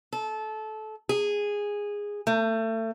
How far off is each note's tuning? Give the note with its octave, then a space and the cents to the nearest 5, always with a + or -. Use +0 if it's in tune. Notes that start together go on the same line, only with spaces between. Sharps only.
A4 -20
G#4 -10
A3 +30